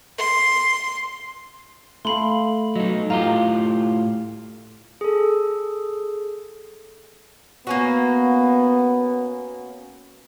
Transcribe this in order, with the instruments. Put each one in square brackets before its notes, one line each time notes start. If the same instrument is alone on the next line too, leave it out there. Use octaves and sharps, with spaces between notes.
[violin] C6
[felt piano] A3 [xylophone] F5 B5 C6
[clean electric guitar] F#3 D#4 [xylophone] D#5
[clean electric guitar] A2 F4 G4 [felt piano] F5 [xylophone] A#5
[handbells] G#4 A4
[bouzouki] A#3 C#4 F#4 [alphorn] B3